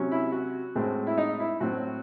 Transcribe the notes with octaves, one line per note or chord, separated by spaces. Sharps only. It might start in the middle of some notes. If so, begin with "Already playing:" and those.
Already playing: C3 F#3 C#4
E4
F#4
A2 G#3 C4
E4
D#4
E4
A2 F#3 C4 F#4